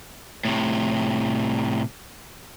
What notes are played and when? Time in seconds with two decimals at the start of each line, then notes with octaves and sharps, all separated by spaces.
0.45 A2 C3